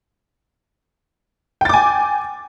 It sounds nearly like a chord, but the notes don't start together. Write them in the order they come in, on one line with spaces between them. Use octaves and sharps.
G5 A6 D6 G#5